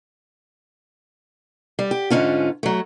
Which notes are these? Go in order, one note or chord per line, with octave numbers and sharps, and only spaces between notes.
G3
G4
G#2 D3 C#4 F4
F#3 A3